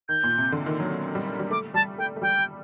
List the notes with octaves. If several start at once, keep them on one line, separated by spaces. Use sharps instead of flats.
D#3 G6
A#2
C3
D3
D#3
F#3
G3
G3
A3 D6
G3 A5
A3 G5
A3
G3 G5